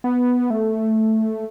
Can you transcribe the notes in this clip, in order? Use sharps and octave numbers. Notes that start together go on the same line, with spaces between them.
B3
A3